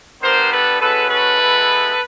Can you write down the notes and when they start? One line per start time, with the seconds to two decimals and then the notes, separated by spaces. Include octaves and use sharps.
0.22 G3 B3 D4 A#4 C5
0.51 A4 B4
0.80 G#3 C#4 F#4 A4 B4
1.10 A4 B4
1.38 G#3 B3 E4